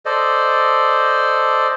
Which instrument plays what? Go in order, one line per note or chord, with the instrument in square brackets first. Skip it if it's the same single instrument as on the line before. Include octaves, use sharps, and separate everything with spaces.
[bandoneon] A4 C5 D5 D#5